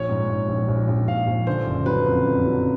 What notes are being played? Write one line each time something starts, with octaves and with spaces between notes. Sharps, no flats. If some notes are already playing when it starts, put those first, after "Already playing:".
Already playing: A#1 C#5
G#2
G#2
A#1
A#1
A#1
A#1 F5
A#1
D3 C5
F#1
F#3 B4
F2
F2
F#3